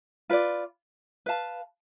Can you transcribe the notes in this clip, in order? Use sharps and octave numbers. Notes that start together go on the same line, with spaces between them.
F4 B4 D5
B4 F5 A5